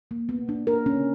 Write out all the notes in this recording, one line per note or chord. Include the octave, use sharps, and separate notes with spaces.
A#3
A#3 B3
A#3 D4
A#3 A#4
D3 C#4